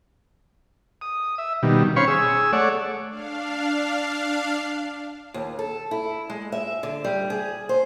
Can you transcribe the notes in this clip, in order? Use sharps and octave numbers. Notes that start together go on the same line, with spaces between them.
D#6
E5
B2 D#3 G3
C#4 C5 C#5 F5 B5 C#6
G#4 E6
A3 C#5 D5 F#5
D4 F5
D#2
A4
E4
G#3
E5
D3
G3
G#4
C5